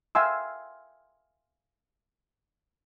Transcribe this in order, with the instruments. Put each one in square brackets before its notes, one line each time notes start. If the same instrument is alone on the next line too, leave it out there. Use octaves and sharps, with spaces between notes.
[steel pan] E5 F5 G5 G#5 C6 E6